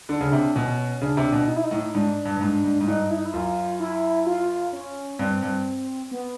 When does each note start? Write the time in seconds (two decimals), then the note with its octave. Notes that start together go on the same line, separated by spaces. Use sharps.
0.09 D3 D4
0.21 C#3
0.32 C3
0.55 B2 C#4
1.01 C#3 D4
1.17 C3
1.32 B2
1.48 D#4
1.56 E4
1.64 D#4
1.71 A2
1.95 G#2 D4
2.25 G2
2.37 G2
2.41 G#2
2.64 G#2
2.81 G#2
2.87 G2 D#4
3.11 E4
3.18 D#4
3.26 E4
3.33 F#2 F4
3.80 E4
4.26 F4
4.73 C#4
5.19 G2 C4
5.42 G2
6.11 B3